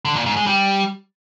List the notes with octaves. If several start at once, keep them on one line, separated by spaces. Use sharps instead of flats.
D3
A#2
G#2
G#3
G3